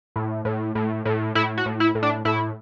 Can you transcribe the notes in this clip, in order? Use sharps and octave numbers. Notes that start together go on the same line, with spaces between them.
A2
A2
A2
A2
A2 E4
F#4
A2
E4
A2
D4
A2 E4